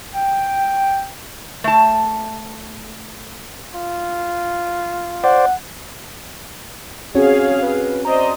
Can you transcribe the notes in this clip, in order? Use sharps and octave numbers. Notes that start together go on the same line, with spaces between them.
G5
A3 A5
F4
C5 D5 F#5
C4 C#4 F#4 G#4 C#5 F5
B4
C5 D5 D#5 A#5